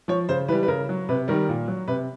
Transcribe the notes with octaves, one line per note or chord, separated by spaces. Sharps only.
F3 C#5
C#3 C5
E3 G3 B4
B4
C#3 A#4
F#3
C3 B4
D#3 G3 A#4
A#2
F#3
C3 B4